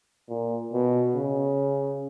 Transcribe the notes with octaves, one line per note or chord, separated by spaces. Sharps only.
A#2
B2
C#3